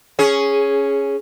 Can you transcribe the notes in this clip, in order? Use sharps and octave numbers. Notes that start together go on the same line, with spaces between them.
C#4 G#4